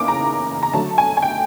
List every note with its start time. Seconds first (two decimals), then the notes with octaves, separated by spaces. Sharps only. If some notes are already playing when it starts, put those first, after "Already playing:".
Already playing: C#3 E3 A#3 D#4 D6
0.08 A#5
0.63 A#5
0.73 D3 F#3 A3 A5
0.98 G#5
1.17 G#5
1.22 G5